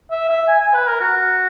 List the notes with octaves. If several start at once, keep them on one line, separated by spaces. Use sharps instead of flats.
E5
E5
G#5
G#5
B4
A#4
F#4